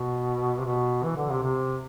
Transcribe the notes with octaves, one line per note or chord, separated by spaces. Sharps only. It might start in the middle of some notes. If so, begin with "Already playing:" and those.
Already playing: B2
C3
B2
E3
D3
C3
C3